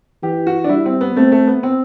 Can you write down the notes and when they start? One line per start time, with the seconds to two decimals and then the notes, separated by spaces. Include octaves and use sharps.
0.23 E3 G4
0.47 F#4
0.64 D4
0.69 G3 E4
0.86 C4
1.01 B3
1.16 A3 C4
1.32 A3
1.47 B3
1.63 C4